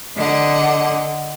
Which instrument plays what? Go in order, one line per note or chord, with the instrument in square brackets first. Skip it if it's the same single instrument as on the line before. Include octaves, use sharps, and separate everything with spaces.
[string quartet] D3 F#5 [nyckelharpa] D#5